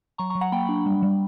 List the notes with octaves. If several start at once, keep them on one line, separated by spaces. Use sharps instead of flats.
F#3 A#5 C#6
A#5 C#6
F#3
F#5 A#5
A#3 G5 B5
D4
G3
G3